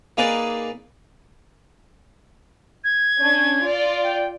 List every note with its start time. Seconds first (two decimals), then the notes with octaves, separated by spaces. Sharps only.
0.17 A#3 D#4 G#4 B4 D5
2.84 G#6
3.21 C#4 D4
3.64 F4 D5
4.03 G5